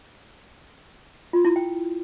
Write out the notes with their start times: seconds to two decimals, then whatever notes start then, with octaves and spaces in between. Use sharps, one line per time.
1.33 F4
1.45 E4
1.56 G5